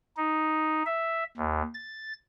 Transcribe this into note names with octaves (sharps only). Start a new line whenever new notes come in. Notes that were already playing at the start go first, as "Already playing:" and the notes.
D#4
E5
D#2
A6